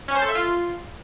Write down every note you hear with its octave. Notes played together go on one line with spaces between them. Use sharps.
C#4
C5
A4
E5
F4